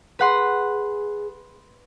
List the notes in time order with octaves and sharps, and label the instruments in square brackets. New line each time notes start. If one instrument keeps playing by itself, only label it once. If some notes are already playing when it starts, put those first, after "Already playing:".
[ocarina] G#4 [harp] B4 F#5 C6